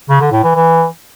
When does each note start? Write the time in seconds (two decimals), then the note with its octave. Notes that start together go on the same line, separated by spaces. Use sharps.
0.09 C#3
0.21 D3
0.32 A2
0.44 E3
0.55 E3